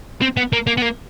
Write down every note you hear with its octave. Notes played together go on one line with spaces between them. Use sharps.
C4
B3
A#3
A#3
B3
A#3